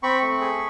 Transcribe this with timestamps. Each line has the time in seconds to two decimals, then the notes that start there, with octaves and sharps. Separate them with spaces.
0.03 C4 B5 C#6
0.22 A3
0.40 G#4